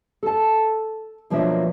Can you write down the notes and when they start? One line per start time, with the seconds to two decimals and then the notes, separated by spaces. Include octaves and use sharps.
0.23 A4 A5
1.30 B2 F3 F#3 A#3 D4 E5